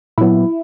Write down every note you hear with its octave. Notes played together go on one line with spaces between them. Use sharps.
A#2 F#3 B3 E4